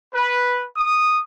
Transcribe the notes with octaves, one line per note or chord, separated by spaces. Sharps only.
B4
D#6